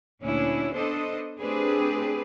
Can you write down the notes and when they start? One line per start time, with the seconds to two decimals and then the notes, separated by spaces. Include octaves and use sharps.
0.22 D2 A#2 C#4 D4 E4
0.74 B3 D4 A4 C5 D#5
1.41 A3 C4 D4 G4 G#4 B4